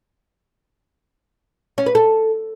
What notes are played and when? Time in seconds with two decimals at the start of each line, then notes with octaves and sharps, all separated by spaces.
1.78 C#4
1.86 B4
1.95 A4